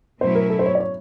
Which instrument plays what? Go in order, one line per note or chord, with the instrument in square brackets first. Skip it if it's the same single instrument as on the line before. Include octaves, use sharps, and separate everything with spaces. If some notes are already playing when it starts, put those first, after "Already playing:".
[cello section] B2 F#3 A3 C#4 E4 [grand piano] C5
[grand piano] A#4
A4
C5
C#5
D5
C#5